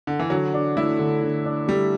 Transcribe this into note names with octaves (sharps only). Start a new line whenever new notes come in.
D3
E3
D3 F#3
D4
A3 E4
D3
D3
D4
G3 A3